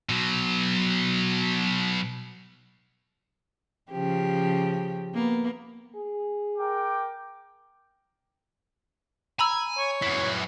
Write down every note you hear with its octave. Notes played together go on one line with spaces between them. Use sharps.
B2 F#3
C#3 F3 G4
A#3 B3
G#4
A#4 G5 D6
G#5 A#5 B5 E6
C#5
F#2 E3 B6